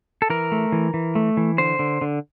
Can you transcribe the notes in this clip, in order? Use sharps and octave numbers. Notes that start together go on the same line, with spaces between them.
A4
E3 A#4
A3
E3
E3
A3
E3
D3 C5
D3
D3